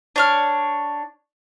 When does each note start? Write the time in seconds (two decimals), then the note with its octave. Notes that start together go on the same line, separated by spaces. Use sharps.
0.16 D4 C#5 F6